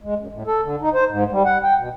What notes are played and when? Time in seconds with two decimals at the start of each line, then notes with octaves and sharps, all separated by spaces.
0.03 G#3
0.19 F#2
0.32 A2
0.47 A4
0.64 D3
0.81 D#4
0.94 C5
1.09 G#2
1.32 G3
1.45 F#5
1.63 G5
1.77 B2